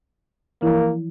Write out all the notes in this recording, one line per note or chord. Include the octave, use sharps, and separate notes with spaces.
E3 F3 A#3 E4